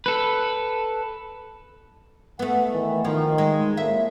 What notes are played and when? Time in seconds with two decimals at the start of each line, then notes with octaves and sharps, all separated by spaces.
0.06 A4 B4
2.39 A3 B3 F#5
2.72 D#3 E3
3.05 D#3 F3
3.38 G#3
3.77 F2 A2 A#3 E5